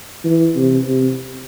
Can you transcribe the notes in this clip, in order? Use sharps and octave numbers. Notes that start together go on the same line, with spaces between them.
E3
C3
C3